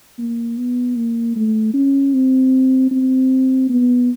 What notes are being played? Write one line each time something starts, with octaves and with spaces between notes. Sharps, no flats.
A#3
B3
A#3
A3
C#4
C4
C4
B3